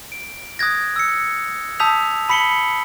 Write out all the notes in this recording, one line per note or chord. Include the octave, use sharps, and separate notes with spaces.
D7
D#6 F#6 G#6 A#6
E6 C#7
A5 D#6 E6 G6 B6 F7
A5 B5 B6 C#7 F#7 G7